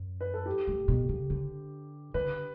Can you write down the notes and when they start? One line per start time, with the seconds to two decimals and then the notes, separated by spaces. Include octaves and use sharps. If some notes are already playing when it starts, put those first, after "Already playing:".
Already playing: F#2
0.21 B4
0.34 A4
0.46 G4
0.67 A2
0.88 B2
1.09 C#3
1.30 D3
2.14 D3 B4